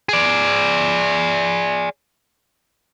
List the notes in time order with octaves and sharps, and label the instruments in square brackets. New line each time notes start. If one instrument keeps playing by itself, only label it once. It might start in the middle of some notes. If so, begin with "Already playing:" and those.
[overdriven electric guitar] G#4 D5